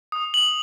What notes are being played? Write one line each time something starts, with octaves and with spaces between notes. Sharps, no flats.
D#6
F#7